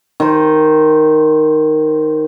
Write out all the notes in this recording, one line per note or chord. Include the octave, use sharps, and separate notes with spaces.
D#3 C5